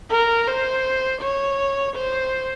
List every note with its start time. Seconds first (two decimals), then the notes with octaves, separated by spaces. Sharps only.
0.10 A#4
0.48 C5
1.22 C#5
1.96 C5